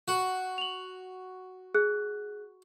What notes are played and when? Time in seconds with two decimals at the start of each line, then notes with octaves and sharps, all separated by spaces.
0.08 F#4
0.58 F7 F#7
1.74 G#4 F#6